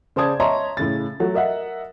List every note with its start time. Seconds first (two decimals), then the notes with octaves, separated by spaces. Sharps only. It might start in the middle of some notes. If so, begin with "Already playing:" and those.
0.16 C#3 C5 D5 A5 D#6 G#6
0.40 C#5 D#5 E5 A5 A#5 C6
0.77 A2 C#3 A6
1.20 F#3 A3
1.34 A#4 D#5 E5 F#5